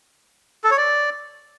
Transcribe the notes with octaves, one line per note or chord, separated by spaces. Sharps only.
A4
C#5
D5